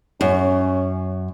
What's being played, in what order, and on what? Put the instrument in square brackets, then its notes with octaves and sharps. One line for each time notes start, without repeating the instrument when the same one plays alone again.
[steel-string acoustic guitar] F#2 [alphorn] C#4